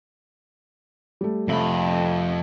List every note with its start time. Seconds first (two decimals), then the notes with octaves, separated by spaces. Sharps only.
1.21 G3 A3
1.48 F2 C3 A3 E5 B5